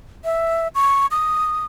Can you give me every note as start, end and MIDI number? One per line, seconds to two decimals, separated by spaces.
0.24 0.68 76
0.75 1.06 85
1.11 1.65 87